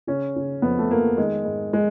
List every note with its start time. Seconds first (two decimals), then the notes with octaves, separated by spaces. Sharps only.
0.07 C#3 C#4
0.36 C#3
0.62 F2 B3
0.79 A3
0.90 F3 A#3
1.17 D#3 G#3
1.45 G#2
1.73 G#3